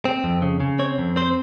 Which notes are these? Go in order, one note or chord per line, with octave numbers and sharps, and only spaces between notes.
C4
F2
C#3
C#3
C4 C#5
F2
C4 C5